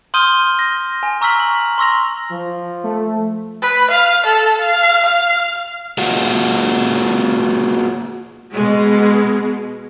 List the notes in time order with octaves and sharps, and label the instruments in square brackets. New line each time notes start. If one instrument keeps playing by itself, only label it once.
[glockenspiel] C6 D#6 F6 G6 D#7 G7
A#6
G#5
A#5 C#6 E6 F6 B6 F#7
F#7
C6 C#6 E6 A#6 F7
[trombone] F3
[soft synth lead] A3
[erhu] B4
F5
A4
F5
F5
[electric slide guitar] A#3 F4 F#4 G#4
[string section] B2 G#3